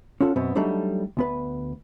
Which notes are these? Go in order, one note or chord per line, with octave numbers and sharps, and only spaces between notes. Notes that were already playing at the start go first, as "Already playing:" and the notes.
C#4 F4 A4 F#5
F#2 B2 B3 C4
F#3 G3 A3 D4 D#4
D2 B3 B4